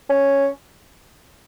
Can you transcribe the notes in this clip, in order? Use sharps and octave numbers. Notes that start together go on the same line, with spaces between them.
C#4